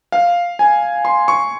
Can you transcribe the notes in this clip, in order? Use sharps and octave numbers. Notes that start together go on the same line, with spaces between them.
F5
G#5
C6
C#6